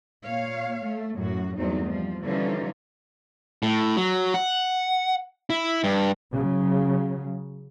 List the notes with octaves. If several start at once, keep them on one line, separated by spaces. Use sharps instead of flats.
A#2 C#5 F5
A3
F#2 A2 F#4
E2 G2 F#3 A3 C4 D#4
F3 G3
D3 E3 F3 G3 C#4 D#4
A2
F#3
F#5
E4
G2
C#3 F#3